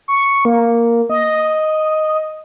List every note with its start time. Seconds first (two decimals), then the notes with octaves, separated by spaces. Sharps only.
0.08 C#6
0.45 A#3
1.09 D#5